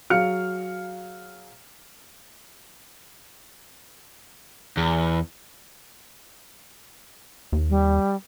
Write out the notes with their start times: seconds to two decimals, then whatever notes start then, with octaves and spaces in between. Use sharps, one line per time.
0.10 F#3 G#4 F5 F6 C#7
4.77 E2
7.52 D#2
7.70 G3